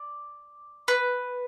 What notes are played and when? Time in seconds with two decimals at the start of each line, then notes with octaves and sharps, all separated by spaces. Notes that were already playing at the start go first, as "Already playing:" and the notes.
Already playing: D5
0.88 B4